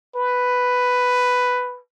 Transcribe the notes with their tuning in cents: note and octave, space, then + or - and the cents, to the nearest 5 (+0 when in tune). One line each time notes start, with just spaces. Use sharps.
B4 +5